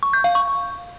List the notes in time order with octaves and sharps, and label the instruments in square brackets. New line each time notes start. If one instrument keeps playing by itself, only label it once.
[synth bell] C#6
G6
F5
C#6